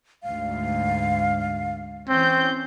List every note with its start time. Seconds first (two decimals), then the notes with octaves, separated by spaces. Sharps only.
0.23 D2 G#2 F5
2.09 E3 C4 C#4 G6